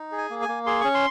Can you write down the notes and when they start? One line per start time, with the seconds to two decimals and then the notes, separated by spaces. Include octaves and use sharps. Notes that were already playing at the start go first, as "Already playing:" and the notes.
Already playing: D#4
0.12 G#4
0.18 G#5
0.30 A#3
0.42 G#5
0.48 A#3
0.66 G#4 C6
0.81 C#4 C#6
0.94 C6